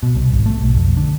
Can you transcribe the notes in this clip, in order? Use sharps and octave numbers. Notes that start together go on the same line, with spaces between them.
B2
C2
G#1
A3
B1
F2
D3